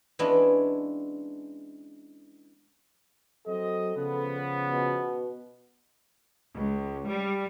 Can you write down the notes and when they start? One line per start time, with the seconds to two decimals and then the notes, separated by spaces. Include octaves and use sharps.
0.19 E3 G#3 B3 C#4 D4
3.46 F#3 C4 A4 D#5
3.95 C#3 F3 B3
4.69 B2
6.53 C#2
7.08 G3